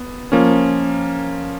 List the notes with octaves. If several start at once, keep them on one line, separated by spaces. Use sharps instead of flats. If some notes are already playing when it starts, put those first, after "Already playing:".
Already playing: B3
F3 A#3 C#4